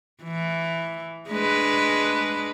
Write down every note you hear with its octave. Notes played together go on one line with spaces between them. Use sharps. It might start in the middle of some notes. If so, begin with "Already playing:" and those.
E3
G#3 D4 B4